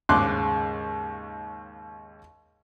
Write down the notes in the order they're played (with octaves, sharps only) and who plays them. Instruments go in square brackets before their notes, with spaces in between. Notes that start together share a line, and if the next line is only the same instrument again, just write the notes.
[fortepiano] D#2 G#2 C#3 C6 D6 F#6